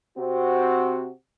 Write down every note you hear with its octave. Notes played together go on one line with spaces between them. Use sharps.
C3 C4 F#4